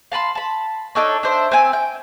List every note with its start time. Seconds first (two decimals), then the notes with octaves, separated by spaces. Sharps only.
0.12 F5 A5 B5 C6
0.35 A5 B5
0.95 D4 D#4 A4 C#5
1.23 D4 C5 E5
1.52 C4 E5 G#5
1.73 G5